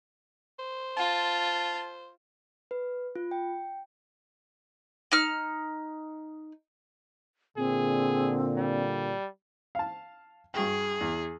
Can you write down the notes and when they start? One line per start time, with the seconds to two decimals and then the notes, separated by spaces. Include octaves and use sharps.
0.59 C5
0.97 F4 A5
2.71 B4
3.15 F4
3.31 G5
5.12 D#4 F6
7.57 A#2 D3 C4 G#4
8.56 G3
9.75 F5 A5
10.54 G2 F#4 G#4 G5
11.01 E2